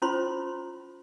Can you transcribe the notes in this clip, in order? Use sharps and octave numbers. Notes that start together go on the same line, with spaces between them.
C#4 E4 F4 C5 B5 C6